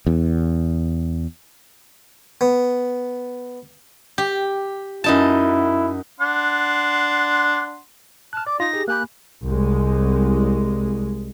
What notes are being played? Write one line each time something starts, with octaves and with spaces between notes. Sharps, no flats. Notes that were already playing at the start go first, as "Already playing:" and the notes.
E2
B3
G4
F#2 D#4 E4 A5
D4 F#5 C6
A5 F6 F#6
D5 D6
D#4 F4 A#6
G4 G#4
A#3 G4 G#5 B5 F#6
C2 G#3